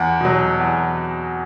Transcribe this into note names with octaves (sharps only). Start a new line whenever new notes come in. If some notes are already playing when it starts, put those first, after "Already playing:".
Already playing: E2 F#5
B2 F#3
E2